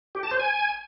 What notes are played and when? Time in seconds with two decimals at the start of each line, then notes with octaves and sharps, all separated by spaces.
0.15 G4
0.23 A5
0.31 C5
0.40 G#5